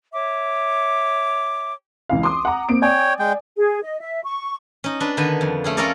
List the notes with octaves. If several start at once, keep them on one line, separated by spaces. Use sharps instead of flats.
C#5 E5 D6
C#2 E3 F5
C6 D6 D#6
F#5 A#5
A#3 C4 D7
C#5 D5 G5 G#5
G#3 G5
G#4
D#5
E5
C#6
C#4 D#4
D4 B4
D3 D#3 B3 B4 G#5
F2
A3 C#4 G#4
C#4 F4 A4 A#4 C#5 D5